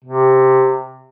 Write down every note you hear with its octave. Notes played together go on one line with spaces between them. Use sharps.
C3